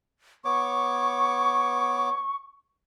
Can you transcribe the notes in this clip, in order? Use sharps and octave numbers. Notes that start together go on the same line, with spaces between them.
B3 C#5 C#6 D6